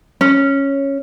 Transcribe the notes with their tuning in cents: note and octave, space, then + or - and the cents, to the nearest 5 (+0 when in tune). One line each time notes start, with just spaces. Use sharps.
C#4 -5